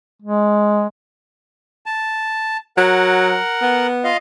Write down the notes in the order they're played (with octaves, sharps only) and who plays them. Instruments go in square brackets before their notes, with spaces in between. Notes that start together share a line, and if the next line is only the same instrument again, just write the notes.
[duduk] G#3
[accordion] A5
[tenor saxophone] F#3 [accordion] A#4 F#5
[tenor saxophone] B3
[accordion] F4 D#5 F5